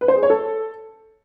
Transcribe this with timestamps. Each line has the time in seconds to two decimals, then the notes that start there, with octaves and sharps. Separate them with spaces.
0.01 B4
0.08 C5
0.15 G#4
0.23 C#5
0.30 A4